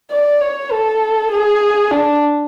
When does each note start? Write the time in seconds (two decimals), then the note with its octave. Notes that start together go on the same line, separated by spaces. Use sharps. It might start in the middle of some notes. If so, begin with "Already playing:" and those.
0.11 D5
0.41 C#5
0.71 A4
1.31 G#4
1.91 D4